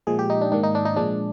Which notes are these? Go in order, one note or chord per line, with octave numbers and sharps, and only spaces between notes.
A#2 F3 G#3 G#4
G4
D#4
D4
G#2 D#3 A#3 D4
D#4
D4
D#4
A#2 F3 G#3 D4